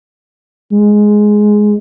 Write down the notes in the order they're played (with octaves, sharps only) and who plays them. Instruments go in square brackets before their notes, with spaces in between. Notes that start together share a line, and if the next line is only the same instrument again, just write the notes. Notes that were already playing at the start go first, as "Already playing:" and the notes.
[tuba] G#3